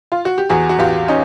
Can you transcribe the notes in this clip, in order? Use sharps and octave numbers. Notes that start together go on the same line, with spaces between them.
F4
F#4
G4
E2 F#4 G#4
F#4
E2 F4 G4
C#4 D#4